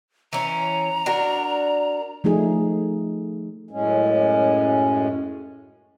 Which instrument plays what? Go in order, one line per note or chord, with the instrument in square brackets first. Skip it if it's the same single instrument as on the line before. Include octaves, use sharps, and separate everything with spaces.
[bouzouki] E3 C#4 [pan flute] A#5
[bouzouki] D4 F#4 A#4
[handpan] F3 A3 D#4 G#4
[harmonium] F#2 A2 G#3 C#4